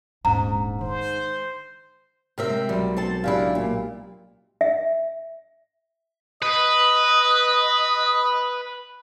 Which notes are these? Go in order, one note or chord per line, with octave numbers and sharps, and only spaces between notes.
D#1 G#2 D4 A#5
D#3 C5
C3 C4 A#4 E5
G#3
B1 G3
C4 A4 A5
C#3 D4 E4 G4 F5
A#2
E5
B4 D#5